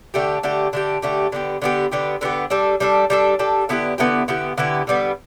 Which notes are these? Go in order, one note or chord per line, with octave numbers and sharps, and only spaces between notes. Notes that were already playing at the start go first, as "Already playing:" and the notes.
D3 A3 G4
D3 A3 G4
D3 A3 G4
D3 A3 G4
D3 B3 G4
D3 B3 G4
D3 B3 G4
D3 B3 G4
G3 D4 A4
G3 D4 A4
G3 D4 A4
G3 D4 A4
D3 B3 E4 G4
D3 B3 E4 G4
D3 B3 E4 G4
D3 B3 E4 G4
D3 G3 B3